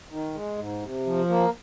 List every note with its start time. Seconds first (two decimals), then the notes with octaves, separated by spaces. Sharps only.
0.10 D#3
0.35 G#3
0.58 G#2
0.82 C3
1.06 F3
1.29 A#3